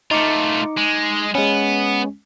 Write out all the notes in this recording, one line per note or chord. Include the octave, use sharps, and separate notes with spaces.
A3 D#4 F4 D6 C#7
G#3
G#3 B3 C#4